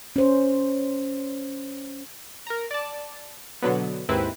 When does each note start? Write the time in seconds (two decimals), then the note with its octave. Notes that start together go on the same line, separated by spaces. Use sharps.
0.16 C#4 C5
2.47 A#4 A#5
2.71 D5 A5
3.62 B2 D3 F#3 B3
4.09 D#2 G#2 C4 E4 B4